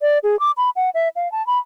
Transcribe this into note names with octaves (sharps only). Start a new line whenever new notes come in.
D5
G#4
D6
B5
F#5
E5
F5
A5
B5